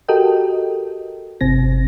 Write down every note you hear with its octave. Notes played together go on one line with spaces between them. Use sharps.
F#4 G4 A4 A#4 D#5 G5
G1 C3 C4 A#6